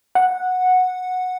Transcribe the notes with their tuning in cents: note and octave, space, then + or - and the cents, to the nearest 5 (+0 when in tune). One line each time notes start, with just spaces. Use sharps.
F#5 -10